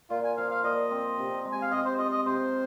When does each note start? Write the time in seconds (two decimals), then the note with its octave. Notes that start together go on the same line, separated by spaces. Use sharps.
0.10 A#2 F4
0.24 G#5
0.37 F3 F5
0.51 F5
0.64 A#2 D#5
0.91 C4
1.18 C3
1.45 G#3
1.52 G#5
1.62 F5
1.71 C3 D#5
1.85 C5
1.99 F4 D#5
2.12 D#5
2.26 C3 C5